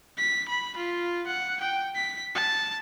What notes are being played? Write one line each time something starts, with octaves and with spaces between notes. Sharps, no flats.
B6
B5
F4
F#5
G5
B6
A5